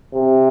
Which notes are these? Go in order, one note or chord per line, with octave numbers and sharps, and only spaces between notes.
C3